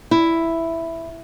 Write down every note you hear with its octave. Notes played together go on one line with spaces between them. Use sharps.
E4